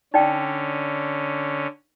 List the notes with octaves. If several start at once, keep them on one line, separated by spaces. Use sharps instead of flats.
D3 C#4 D#4 D5 G5